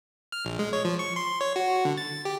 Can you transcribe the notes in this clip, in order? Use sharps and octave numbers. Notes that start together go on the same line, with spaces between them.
F6
A#1
G#3
C#5
F3
C#6
C6
C#5
F#4
D3
A6
G4